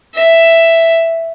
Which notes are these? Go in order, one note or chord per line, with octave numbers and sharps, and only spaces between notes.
E5